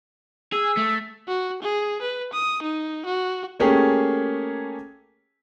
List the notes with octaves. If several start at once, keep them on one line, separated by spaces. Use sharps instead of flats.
G#4 E6
A3
F#4
G#4
B4
D#6
D#4
F#4
A3 A#3 C#4 G4 G#4